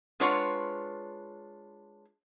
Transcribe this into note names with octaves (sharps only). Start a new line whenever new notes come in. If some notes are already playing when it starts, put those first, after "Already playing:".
G#3 D4 F4 B4 C#5 F#5